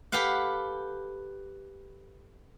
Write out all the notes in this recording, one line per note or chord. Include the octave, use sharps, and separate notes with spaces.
G4 A4 B4 F5 F#5